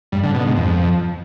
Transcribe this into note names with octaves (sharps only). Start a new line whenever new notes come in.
G2
D3
B2
G#2
F2